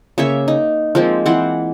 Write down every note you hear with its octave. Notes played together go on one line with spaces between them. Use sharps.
C#3 A#3 C#5 E5
D#4
F3 G#3 A#3 C4
E3 C4 F#5 C6